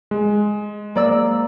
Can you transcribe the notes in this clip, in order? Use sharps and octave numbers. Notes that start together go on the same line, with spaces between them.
G#3
A#3 D5 E6